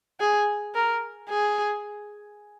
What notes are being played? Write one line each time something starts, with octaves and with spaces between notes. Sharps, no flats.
G#4
A#4
G#4